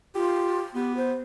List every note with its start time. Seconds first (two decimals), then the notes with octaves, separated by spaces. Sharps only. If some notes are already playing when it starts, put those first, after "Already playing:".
0.15 F4 G4
0.75 B3 G4
0.97 C5